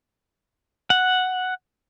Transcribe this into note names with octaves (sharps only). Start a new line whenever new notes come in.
F#5